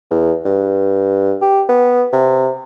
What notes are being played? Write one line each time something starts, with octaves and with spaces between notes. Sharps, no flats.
E2
G2
G4
B3
C3